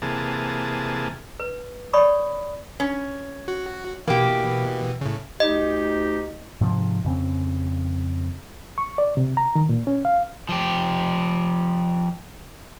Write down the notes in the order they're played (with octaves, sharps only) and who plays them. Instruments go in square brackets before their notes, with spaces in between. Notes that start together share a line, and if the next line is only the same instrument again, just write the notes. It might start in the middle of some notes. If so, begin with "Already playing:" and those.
[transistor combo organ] C3 E3 A#3 G#4 A5
[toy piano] B4
C#5 D5 B5 C#6 D#6
[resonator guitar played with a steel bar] C#4
[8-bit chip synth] F#4
[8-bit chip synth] B2 E3 [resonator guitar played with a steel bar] A#3 G4
[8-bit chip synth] A2 C#3
[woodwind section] D2 D#4 G4 [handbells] D#5
[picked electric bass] G#2 C3 F3
F2 C#3 C4
[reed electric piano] C#6
D5
C3
A#5
D#3
A#2
C#4
F5
[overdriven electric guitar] F3 G4